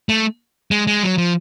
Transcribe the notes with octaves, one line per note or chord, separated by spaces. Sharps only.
A3
G#3
G#3
F#3
F3